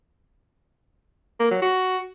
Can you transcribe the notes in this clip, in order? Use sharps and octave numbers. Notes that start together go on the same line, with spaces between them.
A#3
F#3
F#4